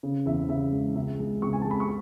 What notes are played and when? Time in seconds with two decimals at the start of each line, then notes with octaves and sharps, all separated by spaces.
0.03 C#3
0.26 E2 E5
0.49 C#3 E5
0.72 G#3
0.95 C#2 E5
1.19 G#3
1.42 C#2 C#6
1.53 G#5
1.61 G#3 A5
1.71 B5
1.80 C#6